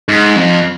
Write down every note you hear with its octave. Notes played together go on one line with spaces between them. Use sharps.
G#2
F2